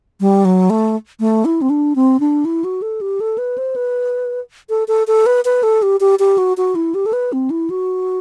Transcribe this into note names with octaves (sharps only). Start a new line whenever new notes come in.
G3
F#3
A3
A3
E4
C4
D4
C4
D4
E4
F#4
A4
G4
A4
B4
C5
B4
A4
A4
A4
B4
B4
A4
G4
G4
G4
F#4
F#4
E4
G4
A4
B4
C4
E4
F#4